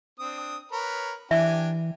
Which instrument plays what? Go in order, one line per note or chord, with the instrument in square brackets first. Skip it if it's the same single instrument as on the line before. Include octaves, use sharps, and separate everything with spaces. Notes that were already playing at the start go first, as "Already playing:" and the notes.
[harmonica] C4 D4 D#6
A#4 B4 C#5
[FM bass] E3 [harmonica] D4 G4 G#5 [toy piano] E5